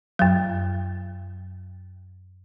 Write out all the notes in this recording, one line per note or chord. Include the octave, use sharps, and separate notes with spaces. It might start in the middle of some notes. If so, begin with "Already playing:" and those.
F#2 F#3